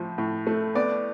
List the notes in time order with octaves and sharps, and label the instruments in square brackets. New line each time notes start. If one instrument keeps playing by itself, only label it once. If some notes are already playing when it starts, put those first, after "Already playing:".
Already playing: [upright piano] A2 F3
A2
A3
B3 D5